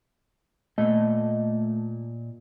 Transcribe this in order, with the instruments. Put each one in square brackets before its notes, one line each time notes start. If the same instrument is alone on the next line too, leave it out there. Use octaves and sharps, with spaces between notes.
[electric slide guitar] A#2 D#5 [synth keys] A3